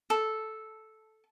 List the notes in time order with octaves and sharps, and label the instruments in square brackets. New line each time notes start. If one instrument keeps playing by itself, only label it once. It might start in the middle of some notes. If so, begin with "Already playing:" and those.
[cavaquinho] A4